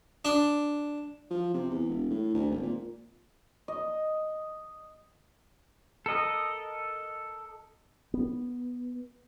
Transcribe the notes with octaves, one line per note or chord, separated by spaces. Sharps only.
D4
F3
C3
E2
E1
A2
D2
G#1
A#2
D#5
A4 A#4 D#5
B3